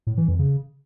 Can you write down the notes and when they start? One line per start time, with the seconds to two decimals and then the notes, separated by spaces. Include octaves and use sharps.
0.07 A2
0.17 E3
0.28 F2
0.39 C#3